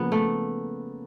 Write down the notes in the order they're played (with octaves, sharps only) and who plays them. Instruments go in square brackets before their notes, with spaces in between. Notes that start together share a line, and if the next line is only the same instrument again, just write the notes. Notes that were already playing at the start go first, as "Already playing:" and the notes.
Already playing: [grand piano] C#3 F3 A#3 [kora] B3
[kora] A3